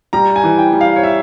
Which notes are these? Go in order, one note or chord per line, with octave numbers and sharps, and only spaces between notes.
G3 A#5
G#5
E3
G5
G3
F5
C#5
E5